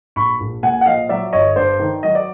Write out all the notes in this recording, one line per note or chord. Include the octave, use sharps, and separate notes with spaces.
A#1 B5 C#6
A#1
A#2 F#5 G#5
F#5
F3 D#5 F5
F#3 D5 E5
G1 C#5 D#5
G2 C5 D5
D#3
F#3 D#5
D5